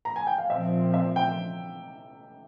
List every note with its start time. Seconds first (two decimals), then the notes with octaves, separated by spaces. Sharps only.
0.05 A#5
0.16 G#5
0.27 G5
0.38 F5
0.50 A#2 F3 C4 E5
0.94 E5
1.16 G5